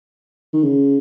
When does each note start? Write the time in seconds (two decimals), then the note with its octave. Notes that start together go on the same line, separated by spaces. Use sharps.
0.54 D#3
0.63 C#3